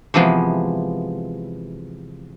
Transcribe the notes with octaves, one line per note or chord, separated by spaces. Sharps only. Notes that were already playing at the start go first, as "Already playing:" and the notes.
C3 E3 F3 G#3 B3